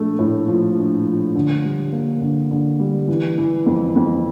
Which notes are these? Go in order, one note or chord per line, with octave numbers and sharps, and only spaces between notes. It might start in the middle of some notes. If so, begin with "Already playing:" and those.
Already playing: A#1 A3
A2
F3
A#1
F3
D3
G3
A#3
D3
D3
G3
E3
E3
F2
F2